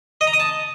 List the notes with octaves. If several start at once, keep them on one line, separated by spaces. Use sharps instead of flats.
D#5
A#5
D#6
A5